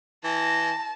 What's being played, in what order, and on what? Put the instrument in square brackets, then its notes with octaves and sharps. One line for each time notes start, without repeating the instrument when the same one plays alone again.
[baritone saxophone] E3 [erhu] A5 [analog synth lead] A#6